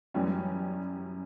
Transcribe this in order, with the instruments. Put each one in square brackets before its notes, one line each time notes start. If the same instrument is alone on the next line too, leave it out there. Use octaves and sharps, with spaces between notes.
[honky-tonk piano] F#2 E3 G3 C#4 G4